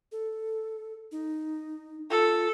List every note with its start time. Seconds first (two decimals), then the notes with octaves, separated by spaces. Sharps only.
0.12 A4
1.12 D#4
2.10 F4 A4